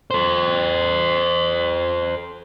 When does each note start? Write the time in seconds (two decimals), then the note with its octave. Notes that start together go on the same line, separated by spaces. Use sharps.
0.11 A4 C5